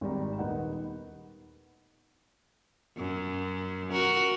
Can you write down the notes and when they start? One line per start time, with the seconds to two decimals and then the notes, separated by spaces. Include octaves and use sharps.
0.01 G#1 D#3 G3 G4 A#5
0.38 D#1 B3 D#4 A#4 F#5
2.97 F#2
3.91 F#4 A#4